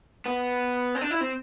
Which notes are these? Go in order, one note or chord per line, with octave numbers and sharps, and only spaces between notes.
B3
C4
D4
E4
C4